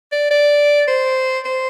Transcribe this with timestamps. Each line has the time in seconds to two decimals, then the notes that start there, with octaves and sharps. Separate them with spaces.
0.12 D5
0.31 D5
0.88 C5
1.45 C5